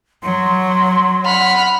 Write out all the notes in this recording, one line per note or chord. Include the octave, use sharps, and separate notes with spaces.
F#3 C6
F#5 B5 F6